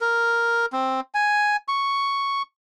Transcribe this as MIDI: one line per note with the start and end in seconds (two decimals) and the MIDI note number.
0.01 0.66 70
0.73 1.00 60
1.14 1.57 80
1.68 2.42 85